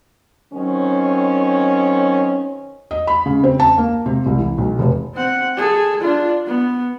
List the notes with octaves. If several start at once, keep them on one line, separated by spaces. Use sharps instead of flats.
D#3 F#3 C4 C#4
D#5
B5
C#3
C4
A5
A#3
C3
C2
E3
B1
F1
C4 F#5
G#4 A4
D4 F4
B3